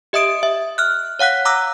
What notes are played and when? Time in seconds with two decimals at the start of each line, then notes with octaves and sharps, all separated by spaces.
0.13 G4 D#5 E5 D#6 D7
0.43 E5
0.78 F6 F#6
1.19 C#5 F5 F#5 F#6 B6
1.45 A#5 D6 E6 F#6 A#6